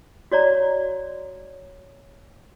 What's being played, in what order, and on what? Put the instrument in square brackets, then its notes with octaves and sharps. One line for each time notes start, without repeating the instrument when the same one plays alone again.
[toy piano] F#4 C#5 D5 A#5